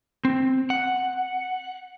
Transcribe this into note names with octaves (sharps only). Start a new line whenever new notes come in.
C4
F#5